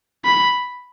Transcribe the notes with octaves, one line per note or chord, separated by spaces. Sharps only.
B5